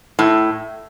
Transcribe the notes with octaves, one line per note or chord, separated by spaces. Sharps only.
A2